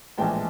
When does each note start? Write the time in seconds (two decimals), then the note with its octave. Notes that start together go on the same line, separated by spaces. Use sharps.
0.18 A#1 A2 E3 G#3 G5 A5